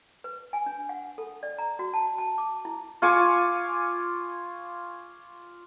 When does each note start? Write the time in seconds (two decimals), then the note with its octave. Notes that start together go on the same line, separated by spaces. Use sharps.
0.24 B4
0.53 G#5
0.66 D4
0.89 F#5
1.18 A4
1.43 D5
1.58 A#5
1.79 F#4
1.94 A5
2.18 A5
2.38 D6
2.65 E4
3.02 F4 G#5 C#6 D6